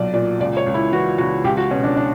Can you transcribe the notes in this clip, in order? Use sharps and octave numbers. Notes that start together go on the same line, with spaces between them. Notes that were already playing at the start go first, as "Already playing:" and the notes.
Already playing: B1 A#2 F#3 D5
A#2 D5
C#2 D5
C#5
C#2
E4
E3 F#4
C#2 F#4
C#2 G4
F#4
B2 C#4
D4
D4